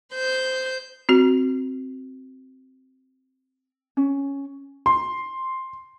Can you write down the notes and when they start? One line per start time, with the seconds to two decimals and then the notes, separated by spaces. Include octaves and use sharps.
0.12 C5 G6
1.09 C4 F#4
3.97 C#4
4.86 C6